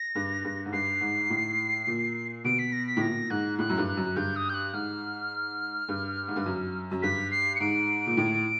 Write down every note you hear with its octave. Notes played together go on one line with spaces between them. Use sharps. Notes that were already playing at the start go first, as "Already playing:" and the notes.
Already playing: A#6
G2
G2
G#2
G2 C7
G#2
A2
A#2
B2 D7
B6
A#6
B6
A2
A#2 A#6
G#2 F#6
A2 F#6
F#2
G2
F#6
F#2
G2 G6
D#6
G6
F#6
G#2 F6
G2
G#2
G2
F#2
F#2
G2 B6
C7
C#7
G#2 D7
A#2
A2